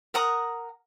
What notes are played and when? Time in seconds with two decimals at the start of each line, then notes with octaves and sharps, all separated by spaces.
0.14 A#4 F#5 A#5 D#6